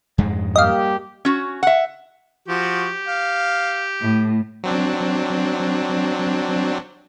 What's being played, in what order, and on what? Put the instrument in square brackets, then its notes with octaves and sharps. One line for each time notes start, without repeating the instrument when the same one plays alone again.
[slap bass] F2 G#2 G#3
[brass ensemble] G3 A#3 G4 [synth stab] D#5 F5
[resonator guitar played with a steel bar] C#4 F#4
E5 F#5
[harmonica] F3 F#4 [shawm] G4
[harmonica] F5
[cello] A2
[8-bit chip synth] F#3 C4 D4